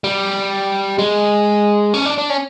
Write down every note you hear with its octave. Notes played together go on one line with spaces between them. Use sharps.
G3
G#3
C#4
D4
D4
C#4